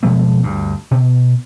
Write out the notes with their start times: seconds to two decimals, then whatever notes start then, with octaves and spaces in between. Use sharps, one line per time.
0.03 B2 F3 G#3 B3
0.43 D2 G2
0.91 B2